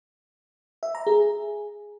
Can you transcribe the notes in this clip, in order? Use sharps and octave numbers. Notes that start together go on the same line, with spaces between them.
E5
A#5
G#4